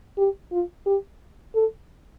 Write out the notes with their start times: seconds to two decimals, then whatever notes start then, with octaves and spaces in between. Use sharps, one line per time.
0.18 G4
0.52 F4
0.86 G4
1.55 A4